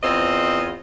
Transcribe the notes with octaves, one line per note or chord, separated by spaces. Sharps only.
E2 C4 F4 C5 D#5